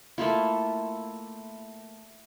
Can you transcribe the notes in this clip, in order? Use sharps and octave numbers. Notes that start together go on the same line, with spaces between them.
A3 A#3 E4 F4